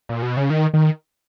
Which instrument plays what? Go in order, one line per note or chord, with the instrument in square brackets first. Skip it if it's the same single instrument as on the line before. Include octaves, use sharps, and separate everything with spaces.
[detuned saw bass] A#2
B2
C#3
D#3
D#3